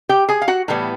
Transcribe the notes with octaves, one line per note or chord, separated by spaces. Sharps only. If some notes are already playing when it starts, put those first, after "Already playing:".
G4 G5
G#4 G#5
F5
F#4 F#5
A2 E3 G3 B3